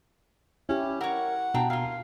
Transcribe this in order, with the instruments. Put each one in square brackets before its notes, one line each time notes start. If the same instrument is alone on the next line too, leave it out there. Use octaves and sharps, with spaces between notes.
[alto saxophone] C#4 [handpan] E4 G4
[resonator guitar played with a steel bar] A#4 C#5 [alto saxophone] F#5
[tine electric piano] B2 [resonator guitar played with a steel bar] D4 G5 A#5
[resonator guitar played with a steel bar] A#3 F4 [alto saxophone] F5